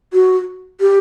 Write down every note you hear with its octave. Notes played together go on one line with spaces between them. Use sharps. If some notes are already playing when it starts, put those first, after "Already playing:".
F#4
G4